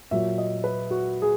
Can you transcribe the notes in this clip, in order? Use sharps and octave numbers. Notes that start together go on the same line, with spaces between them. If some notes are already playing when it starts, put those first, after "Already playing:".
A#2 F#3 E5
D#5
B4
F#4
G#4